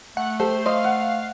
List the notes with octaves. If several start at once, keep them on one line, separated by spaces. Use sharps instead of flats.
A3 F#5
G4 A4 C5
C5 D#5 F5
F#5